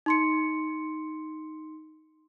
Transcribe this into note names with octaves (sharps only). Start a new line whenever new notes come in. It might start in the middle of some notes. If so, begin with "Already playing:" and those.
D#4 C6 C#7